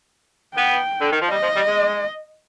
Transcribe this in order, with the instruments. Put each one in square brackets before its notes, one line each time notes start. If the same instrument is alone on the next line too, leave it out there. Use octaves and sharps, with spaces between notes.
[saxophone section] B3 [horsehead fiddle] G5
[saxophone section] D3
D#3
F3
[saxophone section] G3 [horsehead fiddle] D#5
[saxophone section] F3
G3
G#3